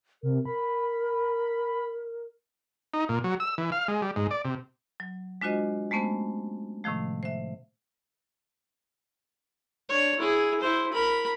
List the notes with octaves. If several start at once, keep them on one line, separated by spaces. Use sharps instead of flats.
C3 A#4
A#4 B5
D#4
A#2
F#3
E6
E3
F5
G#3
G3
G#2
D5
C3
F#3
G#3 D4 F4 F#4 C5 D#5
G#3 A3 B3 C#4 C5
A2 C3 D#3 F3 A3
C5 E5
D4 C#5
E4 G#4
E4 C5
A#4 B5